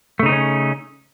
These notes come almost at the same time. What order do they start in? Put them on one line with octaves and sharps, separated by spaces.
A3 C#3 D#4 C4 C#4